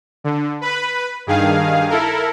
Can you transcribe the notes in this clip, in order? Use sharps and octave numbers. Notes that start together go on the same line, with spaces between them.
D3
B4 B5
G2 D#3 G#4 F5
E4 A4 A#4